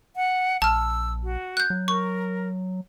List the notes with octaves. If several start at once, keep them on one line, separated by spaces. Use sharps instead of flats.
F#5
A#1 A5 E6 F6
F#4
F#6 G6
F#3
A#4 C#6